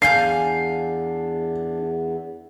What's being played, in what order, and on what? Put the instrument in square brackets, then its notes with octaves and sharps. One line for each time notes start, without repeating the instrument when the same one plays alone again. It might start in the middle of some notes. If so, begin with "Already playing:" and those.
[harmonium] E2 [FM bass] D4 [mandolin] F5 G#5 G6 [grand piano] C7